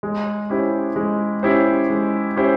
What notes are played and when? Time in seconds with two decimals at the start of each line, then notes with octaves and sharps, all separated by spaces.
0.03 G#3
0.50 C#4 E4 G4 C5
0.96 G#3
1.43 C#4 E4 G4 C5
1.90 G#3
2.37 C#4 E4 G4 C5